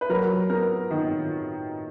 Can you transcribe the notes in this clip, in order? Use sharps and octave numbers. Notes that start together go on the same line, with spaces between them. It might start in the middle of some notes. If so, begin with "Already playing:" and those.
B4
F#3 A#4
B3 A#4
D#3